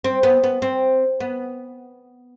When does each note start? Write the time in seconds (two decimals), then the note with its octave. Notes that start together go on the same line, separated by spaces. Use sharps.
0.04 C4
0.23 B3
0.44 B3
0.62 C4
1.20 B3